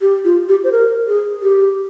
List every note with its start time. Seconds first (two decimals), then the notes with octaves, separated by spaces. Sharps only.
0.01 G4
0.25 F4
0.49 G4
0.64 C5
0.72 A#4
1.07 G#4
1.42 G4